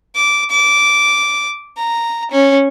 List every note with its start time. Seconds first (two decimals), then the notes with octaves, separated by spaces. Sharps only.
0.15 D6
0.50 D6
1.77 A#5
2.31 C#4